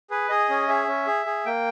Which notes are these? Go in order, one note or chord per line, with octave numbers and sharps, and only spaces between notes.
G#4 B4
G#4 D#5
C#4
G#4 E5
C#4
G#4
G#4
A#3 G5